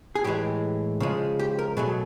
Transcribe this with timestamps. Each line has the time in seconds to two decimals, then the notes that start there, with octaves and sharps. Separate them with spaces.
0.15 G#4
0.24 A2 E3 G#3 G4
1.00 C#3 F3 G#3
1.39 G4
1.59 A#4
1.77 B2 F#3 A3 G#4